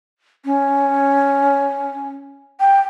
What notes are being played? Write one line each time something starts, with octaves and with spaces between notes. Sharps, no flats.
C#4
G5